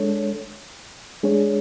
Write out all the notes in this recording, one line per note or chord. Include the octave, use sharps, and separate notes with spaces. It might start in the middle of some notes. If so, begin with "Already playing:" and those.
Already playing: G#3 D4 A4 C#5
G#3 D4 G#4 C#5